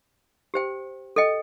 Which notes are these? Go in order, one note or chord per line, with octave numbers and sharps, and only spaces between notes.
G4 C5 G5
A4 D#5 G5